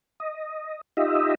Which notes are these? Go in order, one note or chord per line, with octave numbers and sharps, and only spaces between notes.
D#5
D#4 F4 G4 D#5 E5